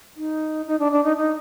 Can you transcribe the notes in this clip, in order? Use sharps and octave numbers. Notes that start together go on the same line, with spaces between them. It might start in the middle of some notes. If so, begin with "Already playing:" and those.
D#4
D#4
D4
D4
D#4
D#4